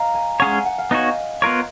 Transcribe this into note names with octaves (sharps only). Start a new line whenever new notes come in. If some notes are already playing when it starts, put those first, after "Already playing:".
Already playing: D#5 F5 A#5
G#5
G#3 C#4 G#4 C#5 F#5
G#5
F#5
F5
B3 D#4 F#4 C#5 D#5
B3 F4 A#4 C#5